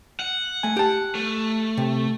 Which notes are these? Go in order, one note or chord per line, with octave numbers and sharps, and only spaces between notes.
F#5
A3 G#5
G4 A5
A3
C3